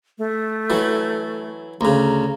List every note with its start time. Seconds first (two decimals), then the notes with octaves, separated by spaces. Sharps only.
0.18 A3
0.70 E3 F#3
1.81 D2 C#3 A#5